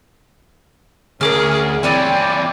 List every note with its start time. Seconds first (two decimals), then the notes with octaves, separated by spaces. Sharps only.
1.21 D2 C#4 G#4 A#4 D6 F6
1.83 E3 C4 C#5 D5 E5 G5 G#5 B5